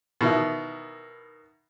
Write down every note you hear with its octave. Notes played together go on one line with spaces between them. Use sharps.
B2 D#3 E4